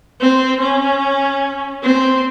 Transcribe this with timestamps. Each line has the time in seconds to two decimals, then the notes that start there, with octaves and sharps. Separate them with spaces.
0.21 C4
0.61 C#4
1.83 C4